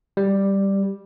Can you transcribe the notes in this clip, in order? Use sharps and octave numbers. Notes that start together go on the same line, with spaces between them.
G3